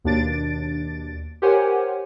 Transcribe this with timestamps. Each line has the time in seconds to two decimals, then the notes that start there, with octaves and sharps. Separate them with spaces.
0.04 D#2 B2 D4 A6 D7
1.42 G4 A#4 C5 C#5 F#5 G#5